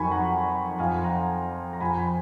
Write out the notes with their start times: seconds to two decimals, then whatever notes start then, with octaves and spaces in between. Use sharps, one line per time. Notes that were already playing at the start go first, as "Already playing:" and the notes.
Already playing: F2 D#3 F#3 G#5 B5 C#6
0.11 F#5 A#5
0.79 F2 F3 F5 G#5
1.04 F#5 A#5
1.73 A#5
1.80 F2 F3 G#5 B5
1.97 G#5 B5